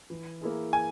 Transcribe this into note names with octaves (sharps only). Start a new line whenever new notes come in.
E3
A#3 E4 G#4
G#5